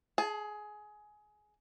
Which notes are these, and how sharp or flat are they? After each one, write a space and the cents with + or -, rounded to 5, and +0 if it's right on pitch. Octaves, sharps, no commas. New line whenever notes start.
G#4 +20 A5 -20